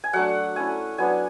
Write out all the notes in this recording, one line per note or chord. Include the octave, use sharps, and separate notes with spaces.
G#5
F#3 A3 D4 F#5
A3 C#4 E4 G#5
F#3 B3 D4 G#5